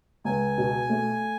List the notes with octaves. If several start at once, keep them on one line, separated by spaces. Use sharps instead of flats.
C#2 G#5
B2
A3